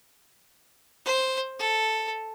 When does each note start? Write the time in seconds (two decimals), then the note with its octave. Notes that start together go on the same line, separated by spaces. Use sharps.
1.05 C5
1.59 A4